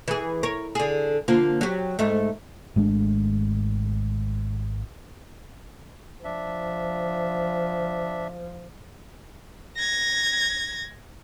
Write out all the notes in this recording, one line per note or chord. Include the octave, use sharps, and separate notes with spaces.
E3 G#4
A#4 C#5
D3 G#4
D3 F3 A#3
F#3 G4
G#2 A3
G#1 G#3 A3 D4
F3 D4 E5
G#6 A#6